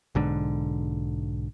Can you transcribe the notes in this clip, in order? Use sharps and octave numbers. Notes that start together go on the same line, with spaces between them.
B1 G#2 D3